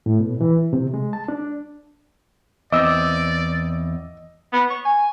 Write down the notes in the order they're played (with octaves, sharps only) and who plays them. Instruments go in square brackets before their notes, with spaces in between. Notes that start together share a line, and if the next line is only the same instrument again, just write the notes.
[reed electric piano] A2
B2
E3
C3
G#3
A5
D4
[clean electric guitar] E2 C4 [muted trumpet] D5 [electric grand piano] D#5 [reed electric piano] D6 E6
[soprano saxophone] B3
C#6
G#5